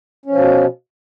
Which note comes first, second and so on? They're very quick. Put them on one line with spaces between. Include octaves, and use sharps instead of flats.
C#4 F3 B2